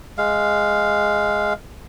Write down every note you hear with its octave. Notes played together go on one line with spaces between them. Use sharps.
G#3 F5